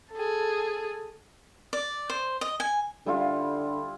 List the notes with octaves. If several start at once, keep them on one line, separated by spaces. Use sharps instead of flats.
G#4 A4
D5
C5
D#5
G#5
D3 G3 E4 F4